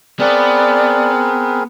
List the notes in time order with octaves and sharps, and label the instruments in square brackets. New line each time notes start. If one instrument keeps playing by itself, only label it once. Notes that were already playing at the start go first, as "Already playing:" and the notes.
[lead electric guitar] B3 [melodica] C4 G#4 A#4 [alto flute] D5